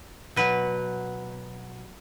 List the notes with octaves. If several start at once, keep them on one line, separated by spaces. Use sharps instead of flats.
B2 F#3 B4